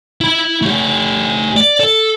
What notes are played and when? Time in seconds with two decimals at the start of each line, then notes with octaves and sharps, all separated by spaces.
0.21 E4 B5
0.62 A3 G4
1.57 D5
1.80 A4